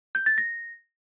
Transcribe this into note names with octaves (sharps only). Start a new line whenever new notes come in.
G6
A6
A#6